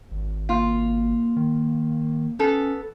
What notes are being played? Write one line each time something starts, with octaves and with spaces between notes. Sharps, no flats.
G#1
A#3 F4
D#3
B3 C#4 A4